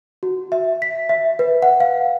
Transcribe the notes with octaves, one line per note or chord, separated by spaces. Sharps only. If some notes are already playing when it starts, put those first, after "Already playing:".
F#4
E5
B6
E5
B4
F#5
F5